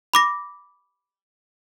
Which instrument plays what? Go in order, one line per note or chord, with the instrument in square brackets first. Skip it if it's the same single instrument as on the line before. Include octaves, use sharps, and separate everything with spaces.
[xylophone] B5 D6 A#6